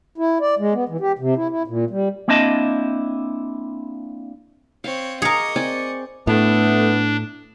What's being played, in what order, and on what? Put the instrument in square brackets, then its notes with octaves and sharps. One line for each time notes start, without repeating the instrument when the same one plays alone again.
[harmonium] E4
D5
G#3
B3
E3
G4
C3
E4
E4
A#2
G3
[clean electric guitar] A#3 C4 D4 E4 D#5 A5
[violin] C4 C#5 [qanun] F5
[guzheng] G#4 A#4 [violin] D#5 C#6 [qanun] A#5 D6 [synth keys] C#7
[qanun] C4 D5 G#5
[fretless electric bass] A2 [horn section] A3 B3 [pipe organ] D4